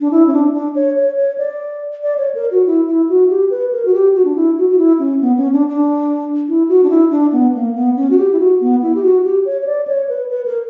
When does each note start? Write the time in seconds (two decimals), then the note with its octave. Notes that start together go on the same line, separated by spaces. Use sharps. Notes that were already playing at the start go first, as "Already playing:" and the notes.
0.01 D4
0.11 E4
0.27 C#4
0.33 D4
0.53 D4
0.75 C#5
0.96 C#5
1.17 C#5
1.38 D5
2.03 D5
2.18 C#5
2.35 A#4
2.51 F#4
2.67 E4
2.87 E4
3.09 F#4
3.30 G4
3.50 B4
3.73 A#4
3.85 F#4
3.93 G4
4.15 F#4
4.25 D4
4.36 E4
4.58 F#4
4.70 F#4
4.78 E4
4.99 C#4
5.21 B3
5.37 C#4
5.53 D4
5.69 D4
6.48 E4
6.69 F#4
6.83 D4
6.90 E4
7.11 D4
7.32 B3
7.55 A#3
7.75 B3
7.96 C#4
8.10 F#4
8.18 G4
8.32 E4
8.40 F#4
8.61 B3
8.82 E4
8.95 G4
9.03 F#4
9.24 G4
9.46 C#5
9.61 C#5
9.66 D5
9.87 C#5
10.09 B4
10.30 B4
10.46 A#4